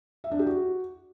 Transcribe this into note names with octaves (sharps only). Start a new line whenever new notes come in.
E5
D4
G4
F#4